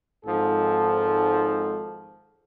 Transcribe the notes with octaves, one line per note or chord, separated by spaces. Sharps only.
G#1 G#2 F3 A4